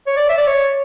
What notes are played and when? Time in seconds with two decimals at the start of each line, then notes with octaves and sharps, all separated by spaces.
0.07 C#5
0.17 D5
0.30 E5
0.38 D5
0.47 C#5